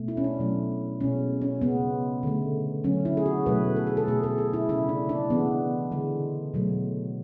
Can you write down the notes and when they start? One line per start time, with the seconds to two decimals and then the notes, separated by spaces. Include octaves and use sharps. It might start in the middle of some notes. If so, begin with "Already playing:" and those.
Already playing: B2 A3
0.08 E4
0.17 C#4
0.24 D4
0.40 B2 F#3 A3
1.01 B2 G#3 C#4
1.42 C#4
1.61 C#3 G#3 B3
2.23 D3 A3
2.84 D3 F#3 A3 C#4
3.05 E4
3.17 G#4
3.26 F#4
3.46 B2 F#3 A3 B4
3.76 A4
3.87 G#4
3.97 A4
4.07 B2 A3 G#4
4.23 A4
4.38 G#4
4.53 E4
4.69 C#3 G#3 E4
4.89 D4
5.09 D4
5.30 C#3 E3 G#3 B3
5.91 D3 G#3
6.54 B2 F#3 A3